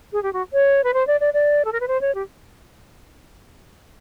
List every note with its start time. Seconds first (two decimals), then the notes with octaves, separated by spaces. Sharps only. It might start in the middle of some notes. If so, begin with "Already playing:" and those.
0.13 G#4
0.23 G4
0.33 F#4
0.53 C#5
0.84 B4
0.94 C5
1.07 D5
1.21 D5
1.34 D5
1.65 A4
1.73 A#4
1.80 B4
1.88 C5
2.01 C#5
2.15 G4